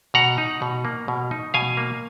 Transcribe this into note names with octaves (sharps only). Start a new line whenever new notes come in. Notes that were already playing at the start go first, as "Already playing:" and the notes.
B2 F#5 A#5
D#4
B2
A#3
B2
D#4
B2 F5 G#5
A#3